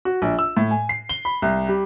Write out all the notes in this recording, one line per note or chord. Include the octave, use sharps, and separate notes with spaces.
F#4
A#1
E6
A2
G#5
C7
G7
B5
C2
G3